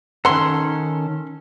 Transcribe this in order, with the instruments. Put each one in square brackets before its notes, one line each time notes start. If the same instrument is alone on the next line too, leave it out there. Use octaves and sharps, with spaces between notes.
[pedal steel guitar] D#3 C#4 A4 [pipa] F#5 C6